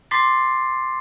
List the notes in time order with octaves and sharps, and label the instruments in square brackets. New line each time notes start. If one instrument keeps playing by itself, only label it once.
[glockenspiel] C6 D6 A6 B6 C7